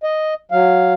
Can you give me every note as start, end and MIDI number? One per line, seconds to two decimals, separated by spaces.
0.03 0.34 75
0.52 0.94 54
0.52 0.94 77